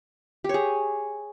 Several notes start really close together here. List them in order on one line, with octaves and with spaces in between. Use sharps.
G4 C#5 G#4